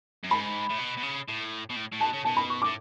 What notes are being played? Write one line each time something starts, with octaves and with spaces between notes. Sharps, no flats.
F#2
G#2 B5
A2
B2
B2
C#3
A2
B2
A2
A2
B2 A5
C#3
B2 A5
B5
C#6
A2 D6